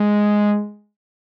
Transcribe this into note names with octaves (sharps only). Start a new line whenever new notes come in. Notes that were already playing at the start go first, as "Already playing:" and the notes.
Already playing: G#3